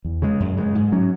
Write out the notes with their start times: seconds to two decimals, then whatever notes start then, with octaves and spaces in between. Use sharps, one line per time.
0.05 E2
0.22 C#3 G#3
0.40 F#2
0.57 C#3 G#3
0.75 G#2
0.92 F#3 C#4